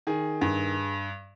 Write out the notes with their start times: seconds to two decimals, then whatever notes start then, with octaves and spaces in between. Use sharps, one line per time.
0.07 D#3 G#4
0.41 G2